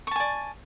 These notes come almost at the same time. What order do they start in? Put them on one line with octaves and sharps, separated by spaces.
C#6 A5 G#5 D5